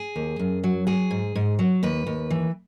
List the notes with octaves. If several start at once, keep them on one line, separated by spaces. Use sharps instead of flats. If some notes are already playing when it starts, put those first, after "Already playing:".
Already playing: G#4
D#2
F#2
F#3
F#3 G#4
G#2
G#2
F#3
D#2 B4
D#2
E3